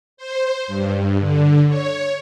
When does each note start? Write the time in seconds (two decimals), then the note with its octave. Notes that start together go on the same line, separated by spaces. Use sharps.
0.17 C5
0.67 G2
1.20 D3
1.69 C#5